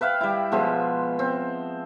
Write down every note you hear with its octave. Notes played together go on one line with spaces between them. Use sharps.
B4 E5 F5 G5
G3 E4
B2 F3 G#3 E5
C4